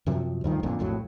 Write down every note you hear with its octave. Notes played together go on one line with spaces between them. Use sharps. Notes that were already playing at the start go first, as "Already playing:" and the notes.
F#2 C3 F3 F#3
D2 G2 D#3 F3
A1 F2 A#2 D3
A#1 F2 A2 F#3